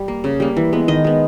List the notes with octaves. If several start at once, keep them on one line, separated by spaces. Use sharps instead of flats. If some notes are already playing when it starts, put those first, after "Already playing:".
Already playing: G3
A#3
C#3
G3 A#3
E3
G#3 B3
D#3 D#5
G#3 B3